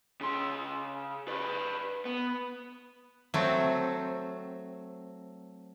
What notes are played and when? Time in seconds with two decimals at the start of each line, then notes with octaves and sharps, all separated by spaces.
0.21 C#3 C6
1.28 B4 D5
2.05 B3
3.34 F#3 A3 C4